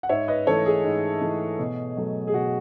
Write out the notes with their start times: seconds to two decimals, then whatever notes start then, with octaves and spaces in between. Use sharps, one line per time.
0.03 F#5
0.09 G#2 C#5 E5
0.28 B4 D#5
0.47 E3 A3 A4 C#5
0.65 G#4
0.84 G#2
1.21 E3 A3
1.59 B2
1.96 F#3 A3
2.27 G#4
2.33 B2 F#4